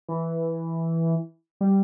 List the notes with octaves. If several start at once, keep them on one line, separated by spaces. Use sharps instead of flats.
E3
G3